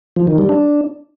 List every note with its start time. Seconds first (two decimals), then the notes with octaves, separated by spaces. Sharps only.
0.16 F3
0.27 D#3
0.38 G3
0.49 D4